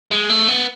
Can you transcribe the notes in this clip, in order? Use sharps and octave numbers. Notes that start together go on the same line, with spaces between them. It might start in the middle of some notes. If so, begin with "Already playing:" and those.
G#3
A3
B3